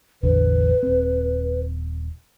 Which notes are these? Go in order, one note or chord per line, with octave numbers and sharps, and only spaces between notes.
A1 E2 D3 B4
D#1 C4